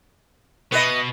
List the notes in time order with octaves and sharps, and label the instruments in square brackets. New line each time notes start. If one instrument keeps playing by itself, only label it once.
[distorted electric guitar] B2 [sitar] B3 B4 D#5